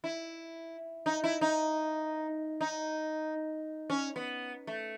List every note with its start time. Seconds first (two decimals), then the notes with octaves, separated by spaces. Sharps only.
0.04 E4
1.06 D#4
1.24 E4
1.41 D#4
2.61 D#4
3.90 C#4
4.16 B3
4.67 A3